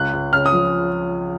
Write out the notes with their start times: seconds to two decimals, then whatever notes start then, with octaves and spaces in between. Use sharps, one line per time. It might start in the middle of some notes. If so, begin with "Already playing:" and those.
Already playing: C#2 F#6
0.13 C#2
0.33 C#3 F6
0.46 D#6
0.52 F3